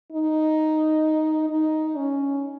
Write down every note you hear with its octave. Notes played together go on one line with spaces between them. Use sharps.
D#4
D#4
C#4